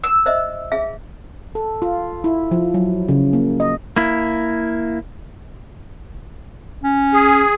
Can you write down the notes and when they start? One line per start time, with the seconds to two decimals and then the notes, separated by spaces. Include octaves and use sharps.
0.04 E6
0.26 C5 D#5 E5
0.72 G#4 E5 F5
1.55 A4
1.82 F4
2.24 E4
2.51 F3
2.74 F#3
3.09 C#3
3.33 A#3
3.60 D#5
3.96 A#3 E4
6.83 C#4
7.13 G#4